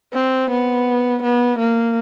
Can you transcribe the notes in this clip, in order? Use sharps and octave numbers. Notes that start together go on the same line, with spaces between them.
C4
B3
B3
A#3